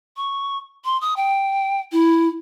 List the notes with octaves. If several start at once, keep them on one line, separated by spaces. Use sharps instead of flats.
C#6
C6
D#6
G5
E4